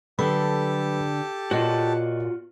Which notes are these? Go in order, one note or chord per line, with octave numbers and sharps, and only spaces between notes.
D3 F#3 G4 A4 B4 A5 B5
A#2 F4 F#4 C#5 D#5